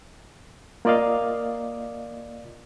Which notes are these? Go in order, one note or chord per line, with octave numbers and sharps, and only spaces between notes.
A#3 F4 D5 D#5 F5